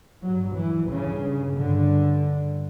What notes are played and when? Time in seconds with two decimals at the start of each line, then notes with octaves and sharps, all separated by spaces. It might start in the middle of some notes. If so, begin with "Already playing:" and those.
0.23 G2 F#3
0.57 E3
0.89 G2 C#3
1.55 G2 D3
2.21 G2